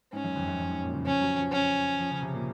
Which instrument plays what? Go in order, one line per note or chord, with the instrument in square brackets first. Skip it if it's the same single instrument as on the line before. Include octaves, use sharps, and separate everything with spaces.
[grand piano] G#2 [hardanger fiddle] C#4
[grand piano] F#2
F2
F#2
F#2
G#2
A#2
C#3
[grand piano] F3 [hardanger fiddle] C#4
[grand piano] F#3
F3
[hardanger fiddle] C#4
[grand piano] F3
C#3
C3
A#2